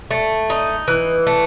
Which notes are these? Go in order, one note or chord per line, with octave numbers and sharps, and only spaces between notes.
A3
D#4
E3
A3